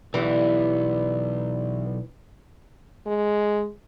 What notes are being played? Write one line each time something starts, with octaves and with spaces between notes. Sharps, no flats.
B1 D3 E3 G3 B3
G#3